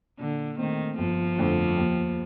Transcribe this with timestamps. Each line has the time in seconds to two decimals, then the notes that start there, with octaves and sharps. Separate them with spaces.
0.19 A#2 D3
0.58 D#3 A3 C4
0.98 G1 F3
1.38 F2 D3 A3
1.77 D#2